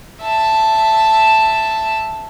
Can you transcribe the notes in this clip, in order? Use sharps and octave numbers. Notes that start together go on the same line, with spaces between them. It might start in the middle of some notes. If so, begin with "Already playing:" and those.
E5 A5